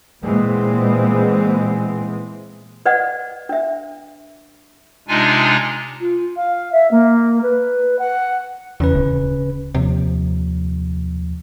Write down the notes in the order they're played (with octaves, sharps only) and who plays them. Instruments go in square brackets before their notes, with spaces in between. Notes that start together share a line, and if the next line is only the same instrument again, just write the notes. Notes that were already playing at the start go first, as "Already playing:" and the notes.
[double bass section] A#2 E3 G#3 B3 C4
[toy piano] B4 D5 D#5 F#5
D4 E5
[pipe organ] C3 G#3 D4 D#4 F4 G#5
[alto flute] F4
F5
E5
A#3
B4
F#5
[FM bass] E2 [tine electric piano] C#3 C#4 B4
[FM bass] D1
[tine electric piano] D#2 F3 [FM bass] C3